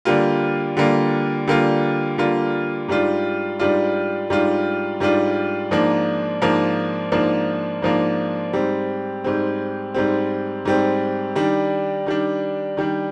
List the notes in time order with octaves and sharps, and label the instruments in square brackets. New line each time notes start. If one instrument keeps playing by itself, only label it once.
[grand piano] D3 G3 A#3 F4
D3 G3 A#3 F4
D3 G3 A#3 F4
D3 G3 A#3 F4
G#2 G3 D4 F4
G#2 G3 D4 F4
G#2 G3 D4 F4
G#2 G3 D4 F4
G#2 F3 A#3 D4
G#2 F3 A#3 D4
G#2 F3 A#3 D4
G#2 F3 A#3 D4
G#2 G3 C4
G#2 G3 C4
G#2 G3 C4
G#2 G3 C4
D#3 G3 D4
D#3 G3 D4
D#3 G3 D4